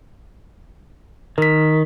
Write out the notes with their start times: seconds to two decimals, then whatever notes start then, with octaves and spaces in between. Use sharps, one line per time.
1.38 D#3 A#4 B6